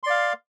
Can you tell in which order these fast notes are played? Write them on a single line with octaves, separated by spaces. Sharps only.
C6 D5 F5